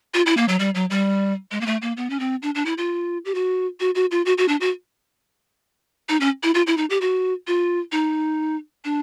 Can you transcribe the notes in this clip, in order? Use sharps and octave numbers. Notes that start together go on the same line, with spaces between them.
F4
E4
A#3
F#3
G3
F#3
G3
G#3
A#3
A3
A#3
B3
C#4
C4
D4
D4
E4
F4
G4
F#4
F#4
F#4
F4
F#4
F#4
D4
F#4
D#4
C#4
E4
F4
E4
D#4
G4
F#4
F4
D#4
D4